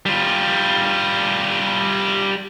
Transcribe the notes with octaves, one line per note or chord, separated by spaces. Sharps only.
G3 F4